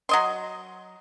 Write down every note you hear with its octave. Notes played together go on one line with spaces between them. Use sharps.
F#3 D#5 C6